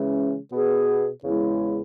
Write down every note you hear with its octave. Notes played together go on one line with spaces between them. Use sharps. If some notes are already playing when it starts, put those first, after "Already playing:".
Already playing: C#3 E3 G#3 C#4
B2 B3 G#4
E2 C#3 G#3 E4